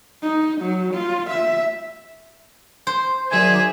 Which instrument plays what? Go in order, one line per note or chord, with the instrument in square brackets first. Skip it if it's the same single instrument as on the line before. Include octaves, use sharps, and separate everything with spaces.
[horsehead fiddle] D#4
F#3
F4
E5
[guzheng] C5
[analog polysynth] D#3 F#3 D5 [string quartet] G#4 E5 [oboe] G#5